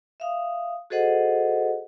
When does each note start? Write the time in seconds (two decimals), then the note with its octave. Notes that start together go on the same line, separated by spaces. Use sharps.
0.20 E5 F5 D#6
0.90 F#4 G#4 A4 C5 D#5 F#5